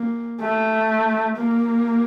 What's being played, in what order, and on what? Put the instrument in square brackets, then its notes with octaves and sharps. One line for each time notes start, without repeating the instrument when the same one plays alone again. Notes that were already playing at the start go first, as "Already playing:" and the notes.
Already playing: [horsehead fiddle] A#3
A3
A#3